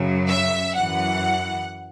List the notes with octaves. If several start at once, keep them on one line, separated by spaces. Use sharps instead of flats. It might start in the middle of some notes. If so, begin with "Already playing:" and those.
Already playing: F#2 C#3 F#3
E5
F#2 E3 F#5